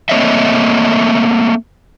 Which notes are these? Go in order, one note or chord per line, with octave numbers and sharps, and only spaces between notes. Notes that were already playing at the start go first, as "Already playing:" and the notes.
A3 A#3 C4 C#5 D#5 E5